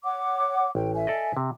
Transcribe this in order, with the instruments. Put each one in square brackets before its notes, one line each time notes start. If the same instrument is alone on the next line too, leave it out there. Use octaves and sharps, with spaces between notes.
[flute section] C#5 F#5 D6
[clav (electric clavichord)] A1 [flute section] G5
[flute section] E5 G#5
[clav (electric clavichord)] A4 D5 D#5
C3